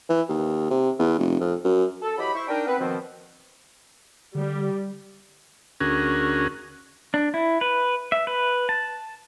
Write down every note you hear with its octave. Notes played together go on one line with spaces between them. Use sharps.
E3
D#2
C3
E2
F1
F2
F#2
A4
E3 F#3 G4 D#5 B5
E4 C5 E5 C#6
D4 D#4 A#4 G5
B3 C4 B4
B2 D#3 F3 C4
D3 G3
D2 C#4 F#4 G#4 A#4
D4
E4
B4
E5
B4
A5